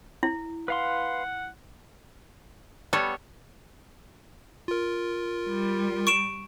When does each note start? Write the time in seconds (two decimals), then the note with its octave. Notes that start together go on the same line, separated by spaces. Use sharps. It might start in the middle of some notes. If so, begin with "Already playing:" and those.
0.23 E4
0.68 B4 F5 F#5 C6
2.93 G3 B3 A4 C#5
4.68 F4 A#4
5.48 G3
6.07 C#6 D7 E7